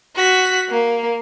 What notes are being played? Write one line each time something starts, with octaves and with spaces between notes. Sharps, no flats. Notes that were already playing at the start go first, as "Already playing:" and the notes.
F#4 B6
A#3